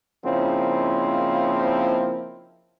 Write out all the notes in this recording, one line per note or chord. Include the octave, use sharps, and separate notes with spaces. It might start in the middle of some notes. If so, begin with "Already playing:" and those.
C#3 F3 A#3 C4 D#4 E4